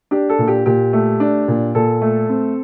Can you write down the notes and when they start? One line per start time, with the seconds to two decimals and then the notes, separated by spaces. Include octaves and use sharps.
0.11 D4 G4
0.29 A4
0.39 A#2
0.48 G4
0.66 A#2 G4
0.93 A3
1.20 D4
1.48 A#2
1.75 A#2 A4
2.02 A3
2.30 C4